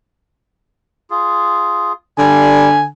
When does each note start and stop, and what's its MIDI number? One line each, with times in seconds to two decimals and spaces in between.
1.10 1.93 65
1.10 1.93 68
2.19 2.89 50
2.19 2.69 55
2.19 2.84 80